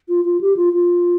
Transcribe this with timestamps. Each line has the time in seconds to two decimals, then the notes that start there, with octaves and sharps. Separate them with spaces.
0.08 F4
0.25 F4
0.41 G4
0.56 F4
0.73 F4